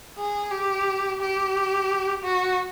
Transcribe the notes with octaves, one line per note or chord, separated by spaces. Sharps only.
G#4
G4
G4
F#4